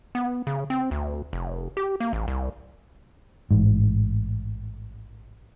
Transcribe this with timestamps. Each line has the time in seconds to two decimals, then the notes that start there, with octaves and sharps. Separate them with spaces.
0.15 B3
0.47 C#3
0.70 C4
0.91 D2
1.33 F1
1.77 G4
2.00 A#3
2.13 A1
2.28 C2
3.51 A1 G#2